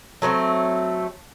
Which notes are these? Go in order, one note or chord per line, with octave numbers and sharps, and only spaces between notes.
F#3 A3 B3 C4